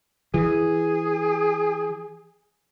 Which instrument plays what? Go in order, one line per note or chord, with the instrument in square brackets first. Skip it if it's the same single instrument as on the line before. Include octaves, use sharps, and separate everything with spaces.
[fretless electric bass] E3 [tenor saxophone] G#4